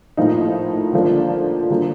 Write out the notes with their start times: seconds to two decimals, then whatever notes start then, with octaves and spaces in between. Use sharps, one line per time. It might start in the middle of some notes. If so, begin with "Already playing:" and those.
0.17 A2 F3 A#3 D#4
0.93 D3 F3 A#3 D4
1.70 D3 F#3 A#3